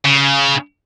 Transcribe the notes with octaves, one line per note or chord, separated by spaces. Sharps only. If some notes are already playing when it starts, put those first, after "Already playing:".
C#3